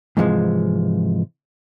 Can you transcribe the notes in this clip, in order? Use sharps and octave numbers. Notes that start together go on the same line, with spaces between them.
G#2 C3 E3 F3 G3 G#3